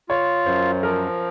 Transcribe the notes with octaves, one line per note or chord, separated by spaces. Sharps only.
F4 C#5
F#2 C5
F3 A#4